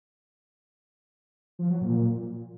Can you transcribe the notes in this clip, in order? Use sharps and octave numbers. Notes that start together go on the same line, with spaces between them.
F3
F#3
A#2